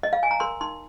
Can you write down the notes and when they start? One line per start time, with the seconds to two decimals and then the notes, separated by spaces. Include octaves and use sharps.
0.03 D#5
0.13 F5
0.23 G#5
0.31 A#5
0.40 A#4 C6
0.61 D#4 C6